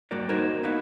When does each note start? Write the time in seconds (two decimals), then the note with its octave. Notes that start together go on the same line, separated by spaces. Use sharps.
0.11 G3 A#3 F#4 A#4 D5
0.29 A#3 D#4 F#4 A#4 C5 G#5
0.63 B3 D#4 E4 F#4 F5